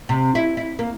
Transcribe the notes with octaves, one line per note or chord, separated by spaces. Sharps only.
C3
E4
E4
A#3